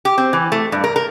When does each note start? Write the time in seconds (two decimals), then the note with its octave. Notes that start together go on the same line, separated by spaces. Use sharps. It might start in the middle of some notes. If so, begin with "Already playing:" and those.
0.05 G4
0.18 C4
0.33 E3
0.52 A3
0.72 G2
0.84 A#4
0.96 A#4